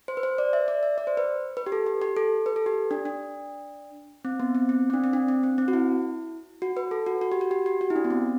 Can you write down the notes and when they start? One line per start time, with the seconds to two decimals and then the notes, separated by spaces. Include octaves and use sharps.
0.08 C5
0.17 B4
0.23 C5
0.38 D5
0.53 E5
0.68 D5
0.83 E5
0.98 D5
1.07 C5
1.17 B4
1.57 B4
1.66 G4
1.72 A4
1.86 G4
2.02 G4
2.17 A4
2.46 B4
2.56 A4
2.66 G4
2.91 D4
3.05 D4
4.25 C4
4.40 B3
4.55 C4
4.69 C4
4.90 C4
4.93 D4
5.04 C4
5.13 D4
5.28 C4
5.43 C4
5.58 C4
5.68 F#4
5.73 E4
6.62 F#4
6.77 B4
6.91 A4
7.06 F#4
7.21 F#4
7.32 G4
7.41 F#4
7.51 G4
7.66 G4
7.81 F#4
7.90 E4
7.96 D4
8.04 B3
8.10 C4